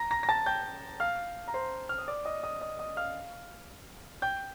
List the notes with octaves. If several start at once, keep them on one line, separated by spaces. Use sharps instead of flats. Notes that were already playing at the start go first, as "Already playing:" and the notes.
Already playing: A#5 A#6
A#5 A#6
A#6
A5 A6
G5 G6
F5 F6
A#5
C5 C6
F6
D#6
D5 D6
D#5 D#6
D#5 D#6
D#5 D#6
D#5 D#6
F5 F6
G5 G6